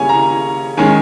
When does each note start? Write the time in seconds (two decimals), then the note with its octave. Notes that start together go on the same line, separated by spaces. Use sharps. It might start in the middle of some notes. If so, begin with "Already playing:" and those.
Already playing: C#3 G3 A#3 C#4 C#5 G#5
0.09 A#5
0.77 D#3 G#3 C#4 G#5